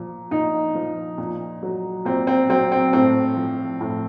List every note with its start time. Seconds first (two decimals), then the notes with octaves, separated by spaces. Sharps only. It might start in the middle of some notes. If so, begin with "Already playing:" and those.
Already playing: A#2 F3
0.31 A#2 D#4
0.75 F3
1.18 A#2
1.63 F#3
2.05 A#2 C4
2.27 C4
2.49 F#3 C4
2.72 C4
2.93 A2 C4
3.36 F3
3.81 A2